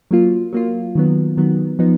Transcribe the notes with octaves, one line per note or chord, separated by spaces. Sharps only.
F#3 A#3 F4
F#3 A#3 F4
D#3 F#3 B3
D#3 F#3 B3
F3 B3 D#4